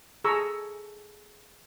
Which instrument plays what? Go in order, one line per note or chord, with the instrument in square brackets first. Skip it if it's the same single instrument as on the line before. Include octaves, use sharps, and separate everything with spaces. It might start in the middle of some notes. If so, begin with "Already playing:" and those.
[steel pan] G#4 A4 A#5 C#6 E6